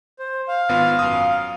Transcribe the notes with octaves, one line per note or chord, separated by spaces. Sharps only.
C5
F5
G#1 B3 F4
F#2 D#6